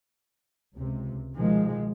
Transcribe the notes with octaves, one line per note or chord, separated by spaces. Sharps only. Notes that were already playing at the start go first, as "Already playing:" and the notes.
C#2 C3
B2 D#3 F3 G#3